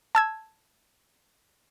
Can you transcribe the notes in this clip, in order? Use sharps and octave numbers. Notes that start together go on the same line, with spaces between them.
A5 E6 G#6